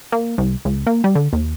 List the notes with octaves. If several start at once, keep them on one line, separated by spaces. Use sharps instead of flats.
A#3
C2
C#2
A#3
G3
D3
D#2